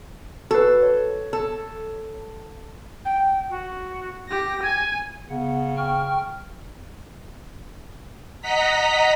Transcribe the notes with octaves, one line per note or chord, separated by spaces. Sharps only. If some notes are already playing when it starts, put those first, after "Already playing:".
F#4 A4 B4
C#5
A4
G5
F#4
G4 A#6
G#5 G#6
C#3 B3 F#5
G5 C#6 F6
D#5 F#5 A#5 B6